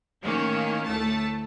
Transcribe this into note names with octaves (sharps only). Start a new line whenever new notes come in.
A2 D#3 A#3 C#4
D2 A2 A3 A5